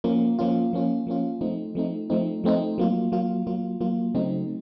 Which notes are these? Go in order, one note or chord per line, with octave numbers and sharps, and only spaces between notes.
F3 A#3 C#4 F4
F3 A#3 C#4 F4
F3 A#3 C#4 F4
F3 A#3 C#4 F4
F3 A3 C4 D#4
F3 A3 C4 D#4
F3 A3 C4 D#4
F3 A3 C4 D#4
F#3 A#3 F4
F#3 A#3 F4
F#3 A#3 F4
F#3 A#3 F4
C#3 F#3 A3 C4 D#4